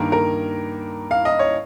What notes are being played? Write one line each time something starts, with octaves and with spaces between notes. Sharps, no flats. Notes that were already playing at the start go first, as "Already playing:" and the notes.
Already playing: G2 D#3 A#3 A#4
A#4
F5
D#5
C#5